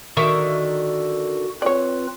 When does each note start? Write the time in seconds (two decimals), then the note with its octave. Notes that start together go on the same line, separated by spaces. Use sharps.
0.17 D3 D#3 F#4 A#4 E5 C#6 D#6
1.62 C4 F4 B4 C#5 D5